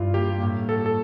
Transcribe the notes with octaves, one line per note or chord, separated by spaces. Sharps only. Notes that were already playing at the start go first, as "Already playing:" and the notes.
Already playing: G2 E4 F4
A#3 G4
A2
A2 A4
A4